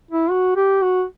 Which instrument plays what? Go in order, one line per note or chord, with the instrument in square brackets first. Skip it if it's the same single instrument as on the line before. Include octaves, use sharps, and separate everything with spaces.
[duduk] E4
F#4
G4
F#4